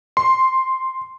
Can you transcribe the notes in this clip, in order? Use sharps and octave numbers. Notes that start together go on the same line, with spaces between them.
C6